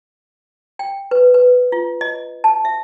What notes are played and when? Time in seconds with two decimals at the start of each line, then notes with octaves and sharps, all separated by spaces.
0.79 G5
1.11 B4
1.34 B4
1.72 F4
2.01 D#5
2.44 A5
2.65 E5